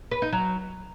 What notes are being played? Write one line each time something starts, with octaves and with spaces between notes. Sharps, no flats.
B4
D#4
F#3